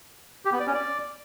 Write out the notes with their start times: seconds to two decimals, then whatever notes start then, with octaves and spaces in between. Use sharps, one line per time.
0.45 G4
0.53 B3
0.60 D5
0.67 C#4
0.74 D5